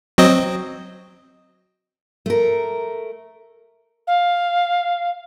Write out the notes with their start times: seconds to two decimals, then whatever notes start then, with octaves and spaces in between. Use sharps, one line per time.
0.18 F#3 C4 D#5
2.26 A3 A#4
4.07 F5